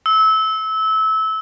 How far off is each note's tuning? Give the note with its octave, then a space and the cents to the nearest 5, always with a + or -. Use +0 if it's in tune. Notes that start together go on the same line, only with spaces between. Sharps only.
E6 -25